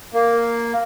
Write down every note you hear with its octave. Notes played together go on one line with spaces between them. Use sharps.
A#3